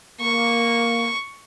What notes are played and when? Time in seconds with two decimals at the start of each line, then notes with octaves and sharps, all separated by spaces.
0.20 A#3 C#6